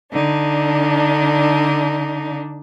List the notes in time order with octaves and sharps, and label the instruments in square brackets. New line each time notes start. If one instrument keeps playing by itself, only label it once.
[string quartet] D3 D4 D#4